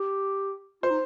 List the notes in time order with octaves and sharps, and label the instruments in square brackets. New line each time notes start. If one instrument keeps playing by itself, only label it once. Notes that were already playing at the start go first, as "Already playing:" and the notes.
Already playing: [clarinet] G4
[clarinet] F4 [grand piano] C5
[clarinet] D#4